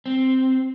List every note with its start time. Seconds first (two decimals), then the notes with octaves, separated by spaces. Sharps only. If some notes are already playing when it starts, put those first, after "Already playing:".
0.06 C4